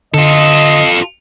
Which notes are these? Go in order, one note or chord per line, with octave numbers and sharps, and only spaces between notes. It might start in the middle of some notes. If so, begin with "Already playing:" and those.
D3 F4 A4 D#5